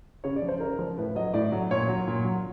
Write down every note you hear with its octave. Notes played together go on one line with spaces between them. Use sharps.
C#3 C#5
D5
F3
C5
C#3 A#4
F3
A2 B4
F#3 D#5
A2 D5
F#3
A#2 C#5
F#3
A#2
F#3